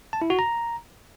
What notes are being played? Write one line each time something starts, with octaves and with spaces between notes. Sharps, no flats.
A5
E4
F#4
A#5